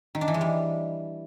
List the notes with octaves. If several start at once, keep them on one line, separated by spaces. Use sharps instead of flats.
D#3
D4
E3
G#3
G3